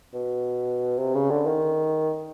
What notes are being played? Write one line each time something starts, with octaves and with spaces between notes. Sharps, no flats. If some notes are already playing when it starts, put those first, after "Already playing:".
B2
C3
C#3
D3
D#3